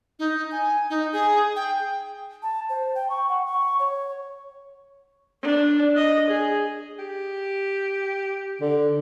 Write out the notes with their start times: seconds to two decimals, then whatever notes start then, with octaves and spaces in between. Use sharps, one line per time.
0.19 D#4
0.52 G#5
0.90 D#4
1.12 G#4
1.56 G5
2.43 A5
2.69 C5
2.95 G5
3.10 C#6
3.29 F#5
3.46 C#6
3.79 C#5
5.43 D4
5.96 D#5
6.30 G#4
6.99 G4
8.61 D3